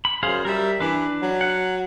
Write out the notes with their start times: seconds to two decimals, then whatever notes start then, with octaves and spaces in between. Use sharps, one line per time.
0.05 B5
0.23 F#2 G#4 C5 F5
0.45 G3 A#4 E5
0.80 E3 D4 B4
1.22 F#3
1.41 F#5